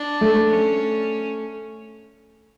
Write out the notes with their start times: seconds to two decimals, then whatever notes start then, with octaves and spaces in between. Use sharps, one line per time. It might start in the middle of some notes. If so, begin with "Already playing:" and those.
Already playing: D4
0.21 A3
0.50 C#4